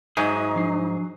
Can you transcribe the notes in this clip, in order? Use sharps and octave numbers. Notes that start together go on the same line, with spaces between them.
G#2 F#3 D#4 G#4 E5
F3 D4 C7